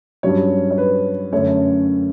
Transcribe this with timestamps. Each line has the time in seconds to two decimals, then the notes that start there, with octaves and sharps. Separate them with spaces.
0.23 G2 F#3 C#4 C#5
0.71 C#5
0.78 B4
1.33 F#2 D3 A3 C#4 C#5